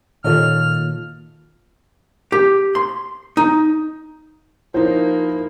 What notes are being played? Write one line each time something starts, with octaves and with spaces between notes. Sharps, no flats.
A#2 D#3 A#3 F4 A4 C#5 D#5 F6
G4
C6
D#4
F3 A#3 D#4 E4 C5